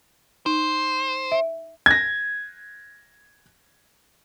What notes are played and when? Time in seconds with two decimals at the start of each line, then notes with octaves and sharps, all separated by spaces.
0.46 D#4 C5
1.32 E5
1.86 G#6 A#6